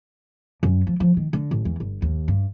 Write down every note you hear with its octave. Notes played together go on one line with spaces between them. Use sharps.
F#2
F3
F3
D#3
D3
A1
E2
G1
D#2
G2